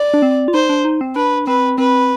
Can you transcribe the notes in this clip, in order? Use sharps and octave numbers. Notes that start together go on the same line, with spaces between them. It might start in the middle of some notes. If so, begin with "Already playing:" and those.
Already playing: D5
D4
C4
F4
D#4 C5
D4
D#4
C4
D4 B4
C4 B4
C4 B4